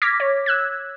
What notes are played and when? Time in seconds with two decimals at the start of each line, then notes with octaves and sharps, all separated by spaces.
0.02 D6 F6 G#6 A#6 B6
0.20 C#5
0.46 E6 F#6 G#6